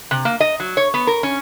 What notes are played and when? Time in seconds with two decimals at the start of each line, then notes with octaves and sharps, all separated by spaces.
0.11 C3
0.25 A#3
0.40 D#5
0.60 F#3
0.77 C#5
0.94 B3
1.07 A#4
1.23 C#4